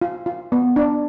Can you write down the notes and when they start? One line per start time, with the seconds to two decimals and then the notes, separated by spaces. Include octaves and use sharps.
0.02 F4
0.26 F4
0.52 B3
0.76 D4